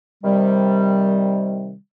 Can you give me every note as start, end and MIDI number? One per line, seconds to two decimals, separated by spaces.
0.24 1.75 48
0.24 1.75 51
0.24 1.75 55